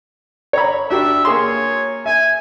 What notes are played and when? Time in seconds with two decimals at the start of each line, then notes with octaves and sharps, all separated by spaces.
0.53 C#5 A#5 B5
0.91 D4 F#4 G4 E5
1.25 A#3 G#4 C#5 C6
2.06 E5 G#5